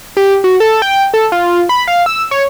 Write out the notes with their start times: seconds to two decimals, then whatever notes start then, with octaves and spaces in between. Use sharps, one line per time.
0.17 G4
0.44 F#4
0.60 A4
0.82 G5
1.14 A4
1.32 F4
1.69 B5
1.88 F5
2.06 E6
2.31 C#5